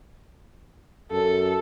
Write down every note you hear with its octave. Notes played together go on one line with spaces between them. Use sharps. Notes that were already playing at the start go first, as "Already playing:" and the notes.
F#2 A4